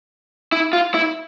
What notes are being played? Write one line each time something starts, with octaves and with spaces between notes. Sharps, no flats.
E4
F4
E4